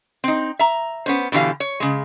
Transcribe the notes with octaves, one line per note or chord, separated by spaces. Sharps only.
C4 D#4
E5 A#5
B3 C#4 C5
B2 D3 E3 G4 F5
C#5
C#3 G#3